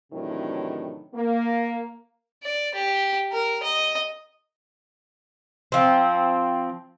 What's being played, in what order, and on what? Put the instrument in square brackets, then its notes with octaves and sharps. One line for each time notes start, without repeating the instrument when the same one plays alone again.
[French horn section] A2 C3 D#3 E3 F#3 D4
A#3
[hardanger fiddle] D5
G4
A#4
D#5
[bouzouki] F3 C4